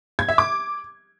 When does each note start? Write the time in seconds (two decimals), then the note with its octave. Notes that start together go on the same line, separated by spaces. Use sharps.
0.19 G#6
0.28 E5
0.38 D6